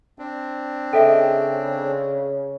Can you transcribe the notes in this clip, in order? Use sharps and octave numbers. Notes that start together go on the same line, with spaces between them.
C4 D4
C#3 A4 D#5 E5 G5